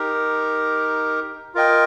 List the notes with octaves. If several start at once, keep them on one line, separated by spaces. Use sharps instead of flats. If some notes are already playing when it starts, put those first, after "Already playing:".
Already playing: D#4 G4 A#4
F4 A#4 D#5 G5